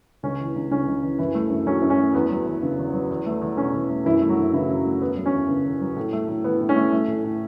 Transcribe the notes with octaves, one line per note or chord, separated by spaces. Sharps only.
C#2 C#4
E3
C#2
C#3 C#4
C#2
E3
F#2 E3 E4
A3
F#2
F#3 C#4
F#2
C#4
A3
E2 B3
F#3
E2
C#3
E2
F#3
E2
A3
E2
B2 C#4
E2
A3
F#2 E3 E4
A3
F#3 F#4
F#2
C#3 E3 E4
F#2
A3
E2 B3
F#3
C#4
E2
C#3
E2
F#3
A2
A3
A2
E3 B3
A2
C#4
A3
A3
A2
A2